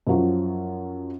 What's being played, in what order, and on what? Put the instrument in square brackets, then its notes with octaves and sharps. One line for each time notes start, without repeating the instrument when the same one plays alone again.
[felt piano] F#2 F3 F#3 F4